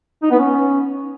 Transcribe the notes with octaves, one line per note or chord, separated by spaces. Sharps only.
D#4
B3
C#4